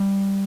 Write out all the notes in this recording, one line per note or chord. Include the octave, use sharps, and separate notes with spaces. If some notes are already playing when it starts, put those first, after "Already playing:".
Already playing: G3